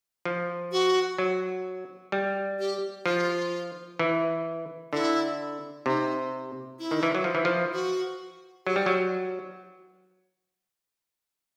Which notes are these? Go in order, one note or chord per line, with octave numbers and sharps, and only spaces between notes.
F3
F#4
F#3
G3
G4
F3 F4
E3
D3 E4
C3 D#4
E4
D#3
E3
F#3
F3
E3
F3
F#4
F#3 G4
G3
F#3